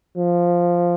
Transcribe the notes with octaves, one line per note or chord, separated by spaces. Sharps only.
F3